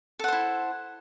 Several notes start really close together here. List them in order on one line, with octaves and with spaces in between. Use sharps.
A4 F#5 C5 E4